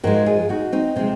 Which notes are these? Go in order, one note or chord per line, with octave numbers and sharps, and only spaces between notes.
G#2 F3 G#3 F#4 A#4
F4 G#4
D#4 F#4
C4 D#4
C3 F3 G#3 C4